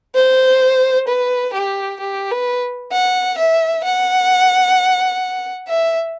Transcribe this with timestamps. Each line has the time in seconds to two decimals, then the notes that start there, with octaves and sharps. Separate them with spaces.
0.15 C5
1.08 B4
1.54 G4
2.01 G4
2.32 B4
2.92 F#5
3.39 E5
3.84 F#5
5.68 E5